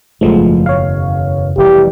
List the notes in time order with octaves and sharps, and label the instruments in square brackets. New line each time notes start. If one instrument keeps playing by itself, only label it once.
[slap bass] F#1 E2 B2 [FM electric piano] F3 G#3 A3
[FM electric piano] C#5 F5
[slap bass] F1 E3 G3 [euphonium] G4